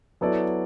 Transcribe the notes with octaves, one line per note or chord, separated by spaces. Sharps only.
F#3 B3 E4 A4 D5